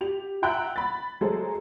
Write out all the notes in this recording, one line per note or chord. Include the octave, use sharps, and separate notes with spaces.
G4 F7
E5 F#5 G5 A#5 E6 F#6
B5 A6
F#3 G#3 A3 G#4 A4 C5